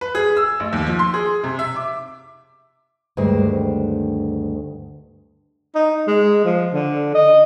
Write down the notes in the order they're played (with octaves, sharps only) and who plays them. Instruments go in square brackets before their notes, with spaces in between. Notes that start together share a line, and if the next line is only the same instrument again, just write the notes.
[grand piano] B4
G#4
E6
A1
D#2
F3
C6
G#4
C3
E5
D6
[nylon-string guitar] D2 G2 D#3 G#3 G4 C5
[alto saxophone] D#4
G#3
F3
D3
D#5